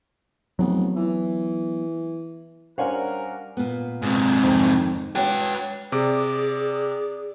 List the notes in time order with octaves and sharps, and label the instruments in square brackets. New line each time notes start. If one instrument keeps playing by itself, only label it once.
[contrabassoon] F1 [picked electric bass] F#3 B3
[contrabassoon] E3
[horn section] G3 A#4 [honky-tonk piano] C#4 D4 [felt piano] C5 [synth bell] F5 F#5 G#5
[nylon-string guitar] A#2 B3
[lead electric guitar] G#2 C3
[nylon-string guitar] F2 D#3
[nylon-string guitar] F#4 C#5 [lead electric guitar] B4 G5
[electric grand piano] C3 D6 [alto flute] G#4 [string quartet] D5